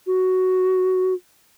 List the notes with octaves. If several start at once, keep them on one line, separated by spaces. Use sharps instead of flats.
F#4